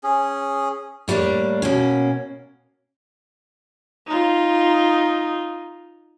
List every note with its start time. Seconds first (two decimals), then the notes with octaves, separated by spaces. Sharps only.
0.04 C#4 G#4
1.08 A2 G3 A#3 C#4 D4
1.62 B2 A#3 C#4
4.07 D#4 F4